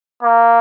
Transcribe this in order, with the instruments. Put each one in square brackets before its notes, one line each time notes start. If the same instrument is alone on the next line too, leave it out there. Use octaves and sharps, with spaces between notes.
[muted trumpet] A#3